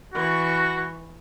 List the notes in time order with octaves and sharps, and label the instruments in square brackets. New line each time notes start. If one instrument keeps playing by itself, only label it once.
[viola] E3 C#6 [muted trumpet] F#4